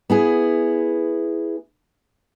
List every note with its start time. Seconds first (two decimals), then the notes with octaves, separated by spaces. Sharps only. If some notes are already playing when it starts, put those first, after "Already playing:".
0.10 B3 E4 G#4